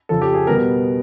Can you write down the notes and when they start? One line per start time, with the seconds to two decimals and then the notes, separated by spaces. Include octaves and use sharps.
0.09 F2 C#3 F3 A4
0.22 G4
0.34 G#4
0.47 B2 G3 B3 A#4